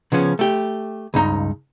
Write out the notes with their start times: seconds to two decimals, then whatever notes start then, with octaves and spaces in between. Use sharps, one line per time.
0.12 C#3 F3 B3 C#4
0.39 A3 G4
1.14 C#2 G2 D#4 A#5